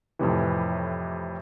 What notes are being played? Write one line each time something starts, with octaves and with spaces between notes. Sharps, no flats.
F2 A2 C3 E3